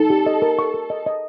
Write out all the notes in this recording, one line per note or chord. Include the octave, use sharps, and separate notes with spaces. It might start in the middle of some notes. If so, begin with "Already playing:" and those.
Already playing: D#4 A4
G4
D#5
A#4
C#6
A#4
D#5
D#5